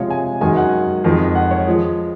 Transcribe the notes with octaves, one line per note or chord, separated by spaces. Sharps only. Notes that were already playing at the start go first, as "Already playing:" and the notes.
Already playing: C3 F3 G#3 C#5 F5
G#5
F#2 D#3 G#3 G#5
F#5
F2 D#3 G#3
F#5
C#5
F3 G#3